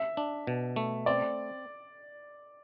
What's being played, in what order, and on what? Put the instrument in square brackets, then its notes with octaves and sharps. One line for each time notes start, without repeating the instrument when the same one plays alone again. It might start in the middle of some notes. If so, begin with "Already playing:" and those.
Already playing: [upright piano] E5
[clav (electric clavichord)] D4
B2
A3
[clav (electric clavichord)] C4 [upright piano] D5